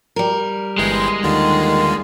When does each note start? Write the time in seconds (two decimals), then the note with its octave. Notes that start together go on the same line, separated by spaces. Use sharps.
0.16 G3 A#4
0.78 G1 E3 G#3 G5
1.23 D#2 D3 D#3 F4